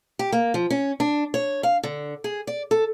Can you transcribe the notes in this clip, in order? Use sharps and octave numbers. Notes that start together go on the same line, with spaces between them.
G4
A#3
F3
C#4
D4
C#5
F5
D3
G#4
D5
A4